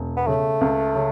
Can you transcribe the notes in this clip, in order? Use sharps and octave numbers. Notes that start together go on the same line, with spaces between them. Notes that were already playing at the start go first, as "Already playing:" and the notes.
Already playing: E1
B3
C#3 A3
C#2
C#3